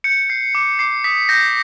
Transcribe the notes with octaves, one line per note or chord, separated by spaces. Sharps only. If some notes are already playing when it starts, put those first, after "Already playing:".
G6 C#7
G6 C7
D6
D6 C7
D#6 B6
G6 A#6